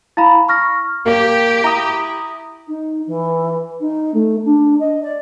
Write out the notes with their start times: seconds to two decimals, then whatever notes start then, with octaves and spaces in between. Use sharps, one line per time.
0.17 E4 F5 A#5 B5
0.48 C#6 F6 A#6
1.06 A#3 G4
1.64 E4 A#5 D#6
2.68 D#4
3.07 E3
3.80 D#4
4.14 A3
4.45 D4
4.80 D#5
5.03 D5